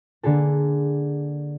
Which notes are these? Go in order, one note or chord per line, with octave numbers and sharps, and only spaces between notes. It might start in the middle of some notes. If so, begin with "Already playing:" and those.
D3 A#3 G#4 A4